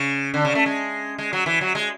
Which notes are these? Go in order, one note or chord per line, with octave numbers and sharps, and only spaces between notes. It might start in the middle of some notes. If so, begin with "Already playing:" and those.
Already playing: C#3
D3
C#3
A3
G#3
G#3
F#3
E3
F#3
G#3